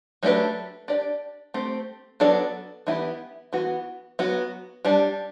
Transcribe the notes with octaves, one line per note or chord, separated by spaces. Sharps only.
F#3 A3 D4 G4 B4
D4 G4 D5
A3 C4 G4
F#3 B3 D4 A4 D5
E3 B3 E4 G4
E3 B3 F#4
F#3 B3 F#4
G3 D4 G4